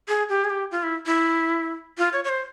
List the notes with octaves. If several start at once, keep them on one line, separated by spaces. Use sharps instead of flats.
G#4
G4
G#4
G4
F4
E4
E4
F4
C#5
C#5
C5